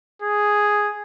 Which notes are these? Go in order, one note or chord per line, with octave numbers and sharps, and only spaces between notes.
G#4